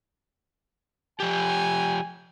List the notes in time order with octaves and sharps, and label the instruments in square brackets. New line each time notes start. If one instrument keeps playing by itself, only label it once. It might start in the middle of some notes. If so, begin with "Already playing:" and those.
[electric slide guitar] F3 G4 [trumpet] G#5